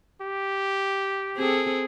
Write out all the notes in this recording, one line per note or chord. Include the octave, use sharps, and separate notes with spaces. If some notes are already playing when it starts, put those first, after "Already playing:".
G4
C4 G#4 A4